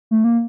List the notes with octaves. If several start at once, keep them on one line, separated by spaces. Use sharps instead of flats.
A3
A#3